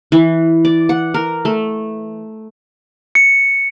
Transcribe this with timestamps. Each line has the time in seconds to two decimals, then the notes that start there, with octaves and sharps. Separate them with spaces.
0.12 E3
0.65 D5
0.89 F#5
1.14 A#4
1.45 A3
3.15 C#7